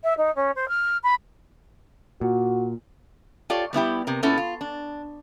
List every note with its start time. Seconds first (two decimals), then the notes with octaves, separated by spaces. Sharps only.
0.04 E5
0.17 D#4
0.35 C#4
0.55 C5
0.68 F6
1.03 B5
2.21 A#2 F#4
3.50 F4 G4 A4 C#5 D5
3.73 G3 B3 E4 G4
4.07 C3 A#4
4.23 A#2 B3 C#4 E4 A4
4.38 F4
4.61 D4